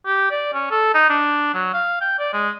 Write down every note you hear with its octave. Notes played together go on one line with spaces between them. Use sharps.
G4
D5
C#4
A4
D#4
D4
F#3
F5
G5
D5
G#3